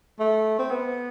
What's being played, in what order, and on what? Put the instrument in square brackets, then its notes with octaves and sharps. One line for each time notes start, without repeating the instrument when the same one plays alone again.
[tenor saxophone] A3
C4
B3